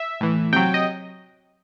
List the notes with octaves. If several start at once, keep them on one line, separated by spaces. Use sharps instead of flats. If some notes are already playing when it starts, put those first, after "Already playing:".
Already playing: E5
A2 E3
C3 F#3 G5
D#5